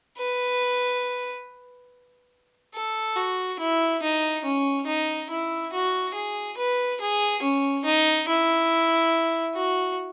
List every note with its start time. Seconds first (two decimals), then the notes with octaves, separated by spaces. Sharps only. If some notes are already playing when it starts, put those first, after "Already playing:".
0.17 B4
2.74 A4
3.16 F#4
3.59 E4
4.02 D#4
4.44 C#4
4.86 D#4
5.30 E4
5.72 F#4
6.14 G#4
6.57 B4
7.01 G#4
7.42 C#4
7.85 D#4
8.28 E4
9.55 F#4